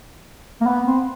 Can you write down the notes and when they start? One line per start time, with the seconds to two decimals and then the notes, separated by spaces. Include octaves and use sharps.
0.61 A#3
0.66 B3
0.86 C4